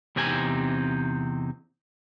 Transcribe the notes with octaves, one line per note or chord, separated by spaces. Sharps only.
E2 C3 C4 D#4 G#5